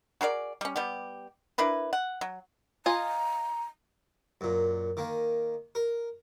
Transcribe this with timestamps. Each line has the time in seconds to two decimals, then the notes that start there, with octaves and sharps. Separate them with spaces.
0.21 F#4 G#4 A#4 D5
0.61 G3 C#4
0.76 G3 B3 G4
1.58 D4 E4 A#4 B4
1.93 F#5
2.21 F#3
2.86 F4 D#5 G#5 A#5
4.41 F#2 A#2
4.97 D#3 A#3
5.75 A#4